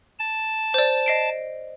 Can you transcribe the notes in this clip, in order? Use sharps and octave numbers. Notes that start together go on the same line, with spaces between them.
A5
C5 D5
D#5 C7 D7